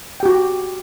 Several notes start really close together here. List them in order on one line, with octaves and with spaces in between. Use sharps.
G5 G4 F#4